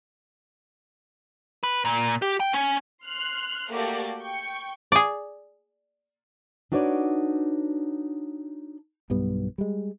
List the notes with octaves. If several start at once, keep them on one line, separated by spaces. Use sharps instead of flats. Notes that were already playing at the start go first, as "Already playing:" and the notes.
B4
A#2
G4
G5
C#4
C6 F6 F#6
A3 A#3 F#4 G4 D5
G5 C#6
G#4 D5
D4 D#4 F#4 B4 C#5 D5
B1 G2 G3 B3
G3 G#3